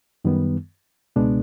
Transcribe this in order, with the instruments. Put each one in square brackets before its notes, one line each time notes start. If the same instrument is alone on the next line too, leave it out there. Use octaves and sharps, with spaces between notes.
[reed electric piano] F#2 D#3 G3 B3
C#2 B2 G#3 B3 D4